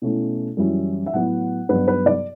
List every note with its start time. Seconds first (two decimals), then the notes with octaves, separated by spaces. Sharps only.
0.02 B2 A3 C#4 E4
0.57 F#2 E3 G3 C#4 E4
1.06 E5
1.13 A2 F#3 B3 E4 F#5
1.69 G2 F#3 B3 B4
1.88 B4
2.06 D5